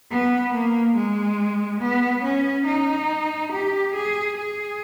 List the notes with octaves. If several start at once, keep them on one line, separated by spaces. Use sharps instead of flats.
B3
A#3
G#3
B3
C#4
D#4
G4
G#4
G#4